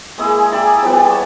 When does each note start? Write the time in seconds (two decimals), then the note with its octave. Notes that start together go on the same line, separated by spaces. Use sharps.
0.18 G#3 A#3 E4 G#4
0.52 G4 G#4 D5 E5
0.82 E3 F3 G3 B3
1.09 C#5 A5